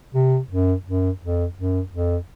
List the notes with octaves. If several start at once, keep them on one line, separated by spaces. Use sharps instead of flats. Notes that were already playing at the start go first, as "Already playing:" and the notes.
C3
F#2
F#2
F2
F#2
F2